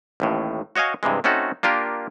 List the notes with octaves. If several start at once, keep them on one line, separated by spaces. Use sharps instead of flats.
A1 D#2 A2
F#4 C#5 D#5 F5 G#5
G2 C3 E3 G#3
A3 C4 C#4 D#4 F#4 A4
A#3 D4 F4 G4 A#4